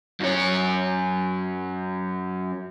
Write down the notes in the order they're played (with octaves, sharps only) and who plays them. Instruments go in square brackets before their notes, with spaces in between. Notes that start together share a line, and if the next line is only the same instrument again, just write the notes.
[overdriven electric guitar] F#2 C#5